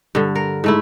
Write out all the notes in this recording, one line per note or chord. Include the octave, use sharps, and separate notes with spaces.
G2 D3
A#4
G#2 A3 E4